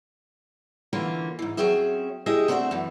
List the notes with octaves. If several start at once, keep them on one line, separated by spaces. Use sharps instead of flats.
D3 E3 A#3 C#4 F4
G#2 E3
F#3 G3 C4 C#4 G#4 E5
E4 G4 G#4 D#5 E5
A3 C4 D4 F#4 C5 E5
F#2 E3